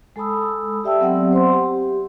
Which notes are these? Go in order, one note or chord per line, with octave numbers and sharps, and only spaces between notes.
G#3 A4 A5 B5 D#6 E6
G4 D5 E5 G5 A5 E6
F#3 B3 C4 G4 D5 F#5
C5 F#5 C6
G4